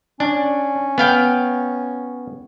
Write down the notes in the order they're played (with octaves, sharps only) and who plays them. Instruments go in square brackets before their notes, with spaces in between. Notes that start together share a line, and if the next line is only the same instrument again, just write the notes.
[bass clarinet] C#4 [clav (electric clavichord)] D4
[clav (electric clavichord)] B3 F5 G5